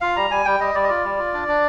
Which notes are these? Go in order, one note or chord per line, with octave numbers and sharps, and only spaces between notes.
F4 F5
G3 A#5
G3 G#5
G3 G5
G3 D#5
G3 D5
D#5
F4 D5
G3
F4
D4
D4